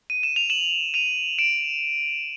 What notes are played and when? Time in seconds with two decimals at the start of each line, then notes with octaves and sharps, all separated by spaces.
0.10 D#7
0.23 E7
0.36 F7
0.50 E7 F#7
0.94 D#7 F7
1.38 D7 E7